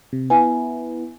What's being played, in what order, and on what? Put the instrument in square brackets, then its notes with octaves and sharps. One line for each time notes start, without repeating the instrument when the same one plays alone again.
[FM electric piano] C3
[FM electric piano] B3 E4 [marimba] G#5